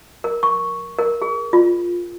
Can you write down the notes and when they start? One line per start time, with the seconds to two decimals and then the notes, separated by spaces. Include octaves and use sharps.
0.24 A#4
0.43 C#6
0.99 A#4
1.22 G#4
1.53 F4